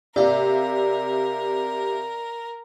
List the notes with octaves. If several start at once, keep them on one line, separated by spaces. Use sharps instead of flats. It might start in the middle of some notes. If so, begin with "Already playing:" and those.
C3 A#4 D5 F5